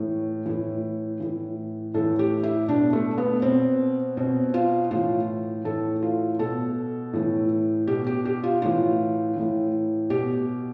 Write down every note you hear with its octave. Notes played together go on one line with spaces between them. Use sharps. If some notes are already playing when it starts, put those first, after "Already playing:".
Already playing: A2 E3
A2 E3
A2 E3
A2 E3 A4
G4
E4
B2 D4
A3
B3
B2 C4
B2 C4
F4
A2 E3 F4
A2 E3 A4
F4
B2 A4
A2 E3
B2 G4
G4
G4
F4
A2 E3 F4
A2 E3
B2 G4